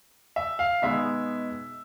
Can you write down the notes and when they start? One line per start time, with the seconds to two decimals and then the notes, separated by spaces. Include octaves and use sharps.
0.36 E5
0.59 F5
0.82 B2 G#3 B3 D#4 E5